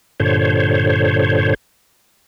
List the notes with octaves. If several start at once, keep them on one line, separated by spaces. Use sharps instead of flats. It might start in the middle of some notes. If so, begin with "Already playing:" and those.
G2 A#2 D3 C5 C#5